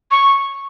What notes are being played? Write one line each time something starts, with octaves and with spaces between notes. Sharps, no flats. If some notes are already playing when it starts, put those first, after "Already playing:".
C#6